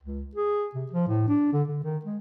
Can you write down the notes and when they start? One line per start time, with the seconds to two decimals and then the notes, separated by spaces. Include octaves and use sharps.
0.03 C#2
0.35 G#4
0.75 C3
0.91 F3
1.08 A2
1.28 D4
1.53 D3
1.68 D3
1.83 D#3
2.05 G#3